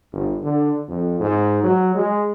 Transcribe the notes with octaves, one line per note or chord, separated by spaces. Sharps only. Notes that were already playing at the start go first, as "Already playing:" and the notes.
G1
D3
F2
G#2
F#3
G#3